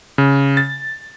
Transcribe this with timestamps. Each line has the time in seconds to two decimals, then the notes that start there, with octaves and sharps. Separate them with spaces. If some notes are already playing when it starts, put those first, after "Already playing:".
0.18 C#3
0.57 A6